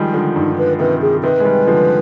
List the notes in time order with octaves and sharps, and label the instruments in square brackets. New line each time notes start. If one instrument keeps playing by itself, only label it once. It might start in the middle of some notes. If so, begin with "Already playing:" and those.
Already playing: [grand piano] D#3 F3 G3 G#3
D3 F3
[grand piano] G2 [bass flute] D#4
[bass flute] B4
[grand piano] C3 D#3 [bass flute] B4
[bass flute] G#4
[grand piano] C3 D#3 [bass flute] B4
[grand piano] G#3
D#3 G3
D3 F3